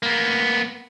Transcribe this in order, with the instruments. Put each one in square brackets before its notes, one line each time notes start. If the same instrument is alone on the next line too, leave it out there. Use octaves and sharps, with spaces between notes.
[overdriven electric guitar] A#3 B3